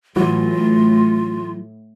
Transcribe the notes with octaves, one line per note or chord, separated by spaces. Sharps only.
A2 E3 F#3 F4